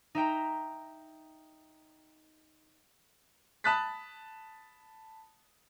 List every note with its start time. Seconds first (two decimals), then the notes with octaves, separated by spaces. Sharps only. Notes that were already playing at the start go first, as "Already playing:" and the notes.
0.15 D#4 E5 G5 A#5
3.64 A5 B5 D#6 F#6 A6 B6